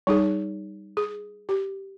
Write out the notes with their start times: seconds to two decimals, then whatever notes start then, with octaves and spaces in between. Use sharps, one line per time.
0.07 G3 D#4 G#4
0.97 G#4
1.49 G4